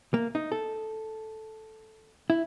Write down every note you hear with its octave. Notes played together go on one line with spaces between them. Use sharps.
A#3
D#4
A4
E4